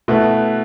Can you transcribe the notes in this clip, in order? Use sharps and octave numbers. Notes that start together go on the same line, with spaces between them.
B2 A3 E4 B4